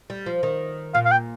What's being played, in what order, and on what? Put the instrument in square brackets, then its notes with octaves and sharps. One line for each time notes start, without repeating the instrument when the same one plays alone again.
[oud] G3
F3
D#3
[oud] A#2 [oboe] F5
[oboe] F5
G5